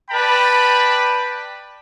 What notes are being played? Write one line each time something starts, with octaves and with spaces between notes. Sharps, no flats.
B4 D5 G5 A5 B5